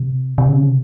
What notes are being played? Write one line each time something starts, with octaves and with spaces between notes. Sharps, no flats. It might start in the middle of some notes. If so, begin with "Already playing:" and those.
Already playing: C3
C3
C#3
C3